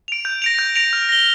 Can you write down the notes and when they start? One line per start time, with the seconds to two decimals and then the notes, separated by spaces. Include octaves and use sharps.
0.08 D7 F7
0.25 G6
0.42 A#6 D7 F7
0.59 G6
0.76 A#6 D7 F7
0.93 F6
1.09 A#6 G7